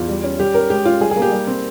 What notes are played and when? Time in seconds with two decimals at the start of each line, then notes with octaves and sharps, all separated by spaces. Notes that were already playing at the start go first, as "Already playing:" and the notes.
Already playing: E2 F4
0.09 G3
0.24 C#4
0.39 G3 G4
0.54 C#4 A#4
0.70 G#3 G4
0.85 C#4 F4
1.01 G3 G#4
1.11 G#4
1.16 A#3
1.22 G4
1.32 G3
1.47 C4